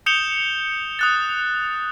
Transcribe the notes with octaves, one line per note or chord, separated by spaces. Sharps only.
D#6 G6 C#7 E7 F7 G7
D#6 F#6 A6